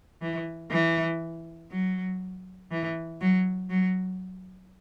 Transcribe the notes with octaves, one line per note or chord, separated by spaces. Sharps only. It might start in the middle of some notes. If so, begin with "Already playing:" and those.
E3
E3
F#3
E3
F#3
F#3